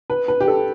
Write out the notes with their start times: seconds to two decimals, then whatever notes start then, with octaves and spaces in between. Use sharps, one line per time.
0.10 B4
0.28 B4
0.40 G4
0.48 A4